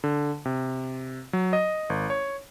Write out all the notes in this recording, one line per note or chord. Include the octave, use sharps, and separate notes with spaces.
D3
C3
F#3
D#5
G#1
C#5